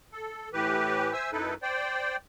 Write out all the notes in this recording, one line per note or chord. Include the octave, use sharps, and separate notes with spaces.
A4
A2 E3 G4 B4
C5 E5 G#5 E6
F#2 D#4 E4 A4 B4
C5 D5 G5